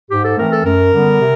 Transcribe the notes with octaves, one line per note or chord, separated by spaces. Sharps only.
G#2 G4
A4
E3 A3 C4 A#4
A4
F#2 A#4
D3 G3 B3
C3